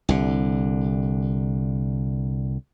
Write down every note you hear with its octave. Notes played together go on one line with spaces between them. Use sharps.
C2 D3